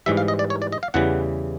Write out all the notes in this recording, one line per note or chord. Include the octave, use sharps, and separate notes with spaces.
G#2 E3 G3 E5
F5
D#5
D5
C#5
D5
D#5
F5
E2 C#3 E3 G3 F#5